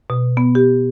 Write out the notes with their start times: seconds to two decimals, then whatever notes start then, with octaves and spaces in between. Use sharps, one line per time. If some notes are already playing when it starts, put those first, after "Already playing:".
0.10 B2
0.37 B3
0.55 G4